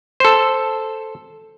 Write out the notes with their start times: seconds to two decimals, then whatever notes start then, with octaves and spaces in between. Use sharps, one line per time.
0.20 A4 C5